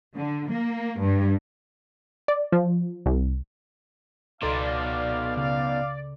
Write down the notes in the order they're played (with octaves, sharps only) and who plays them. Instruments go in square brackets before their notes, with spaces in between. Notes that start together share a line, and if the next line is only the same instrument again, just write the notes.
[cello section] D3
A#3
G2
[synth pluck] D5
F3
C2
[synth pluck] C#2 A4 C6 [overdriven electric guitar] B2 D#4 [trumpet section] D4 F5 [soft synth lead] D5
[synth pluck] C#3 [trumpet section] F5